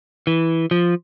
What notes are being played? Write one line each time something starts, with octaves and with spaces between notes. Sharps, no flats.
E3
F3